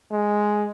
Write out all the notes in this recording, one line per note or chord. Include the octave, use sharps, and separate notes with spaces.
G#3